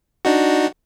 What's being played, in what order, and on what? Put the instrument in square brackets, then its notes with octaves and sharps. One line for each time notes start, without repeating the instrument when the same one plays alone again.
[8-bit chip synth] D4 D#4 F#4